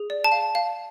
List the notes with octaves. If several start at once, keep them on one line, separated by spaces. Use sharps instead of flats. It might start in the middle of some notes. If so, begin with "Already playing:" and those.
Already playing: G#4
D5
A5
F5
F5